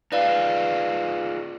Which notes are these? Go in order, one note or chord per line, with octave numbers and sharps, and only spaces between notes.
D#4 F4 G#4 B4 D5 F5